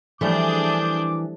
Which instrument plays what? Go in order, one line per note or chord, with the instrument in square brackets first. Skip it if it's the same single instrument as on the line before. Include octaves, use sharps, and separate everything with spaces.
[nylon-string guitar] E3 [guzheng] F3 G3 A3 [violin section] D4 G#4 G6 [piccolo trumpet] D6